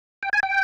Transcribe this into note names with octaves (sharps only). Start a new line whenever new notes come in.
G5
G#5
G5